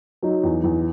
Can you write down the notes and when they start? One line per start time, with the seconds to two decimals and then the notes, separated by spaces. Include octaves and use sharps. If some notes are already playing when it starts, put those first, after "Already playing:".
0.23 F#3 D#4
0.44 E2
0.64 E2